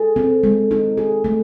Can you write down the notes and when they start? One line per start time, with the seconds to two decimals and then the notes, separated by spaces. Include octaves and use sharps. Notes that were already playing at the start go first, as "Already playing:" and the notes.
Already playing: G#4 A4
0.16 C4
0.43 G#3
0.71 D#4
0.97 G#4
1.24 A3